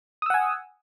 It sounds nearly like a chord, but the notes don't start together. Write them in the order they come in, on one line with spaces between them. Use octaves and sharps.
D#6 E6 F#5 G#5